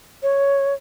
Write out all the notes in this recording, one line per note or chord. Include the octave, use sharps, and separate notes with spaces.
C#5